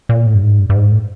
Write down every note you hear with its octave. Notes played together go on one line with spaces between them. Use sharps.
A#2
A2
G2
G#2
G2
G2
G#2
A2